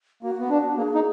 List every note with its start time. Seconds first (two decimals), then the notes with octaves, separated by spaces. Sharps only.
0.23 A#3 F#4
0.40 B3
0.50 D4
0.77 A#3 G#4
0.95 D#4